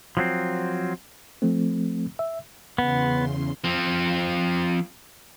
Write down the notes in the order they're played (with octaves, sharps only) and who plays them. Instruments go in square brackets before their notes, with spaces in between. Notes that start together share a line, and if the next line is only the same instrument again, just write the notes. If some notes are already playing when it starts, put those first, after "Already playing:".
[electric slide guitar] F3 F#3 C4
[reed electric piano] F3 A3 C4
E5
[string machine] E2 C#3 C6 [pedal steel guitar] B3
[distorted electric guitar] F3 C4